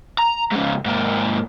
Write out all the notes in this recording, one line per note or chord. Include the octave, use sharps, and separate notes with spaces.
A#5
G#2 C#3
G#2 A#3